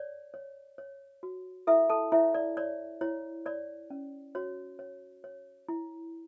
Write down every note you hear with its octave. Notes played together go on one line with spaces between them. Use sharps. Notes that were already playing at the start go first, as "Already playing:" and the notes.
Already playing: C#5 D5
C#5
C#5
F#4
E4 A4 E5
A4 A5
E4 C#5 E5
D5
C#5 D5
E4 C#5
C#5 D5
C#4
F#4 C#5
C#5
C#5
E4